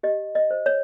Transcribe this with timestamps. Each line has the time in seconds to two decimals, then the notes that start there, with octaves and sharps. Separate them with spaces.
0.03 G4 D#5
0.35 D#5
0.51 C5
0.66 C#5